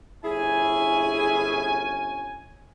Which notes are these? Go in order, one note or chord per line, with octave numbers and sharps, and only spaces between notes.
G1 C#4 E4 G#4 G#5